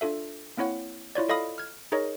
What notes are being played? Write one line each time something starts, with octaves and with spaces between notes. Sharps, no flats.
D4 F4 A4 E5
A#3 C4 E4 C#5 F#5
E4 F4 C#5 D5
F4 A4 D#5 F5 B5 D#6
F6 G#6
D#4 G#4 A#4 C#5 D#5